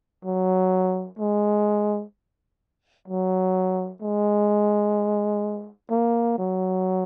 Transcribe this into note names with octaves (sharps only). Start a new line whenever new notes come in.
F#3
G#3
F#3
G#3
A#3
F#3